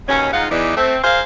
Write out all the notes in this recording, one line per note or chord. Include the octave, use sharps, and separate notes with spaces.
D#2 B2 C#4
G#2 D#4 F4 F5 F#5
E2 E3 D#4 D5
A3 C4
G#4 A#4 C5 F5